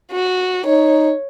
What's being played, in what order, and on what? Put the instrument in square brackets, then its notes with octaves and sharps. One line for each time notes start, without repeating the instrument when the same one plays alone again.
[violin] F#4
[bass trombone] D#4 [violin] C#5